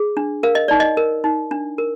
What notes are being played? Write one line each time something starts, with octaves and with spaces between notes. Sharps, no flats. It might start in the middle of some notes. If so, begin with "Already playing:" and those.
Already playing: G#4
D4
A#4 F5
D#5
D#4 D5
D#5
A#4
D#4
D4
A#4